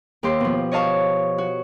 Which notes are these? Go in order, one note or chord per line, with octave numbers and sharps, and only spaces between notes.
D#2 G4 C6
B2 F3
C#5 D#5 F5 A5 C#6
F#4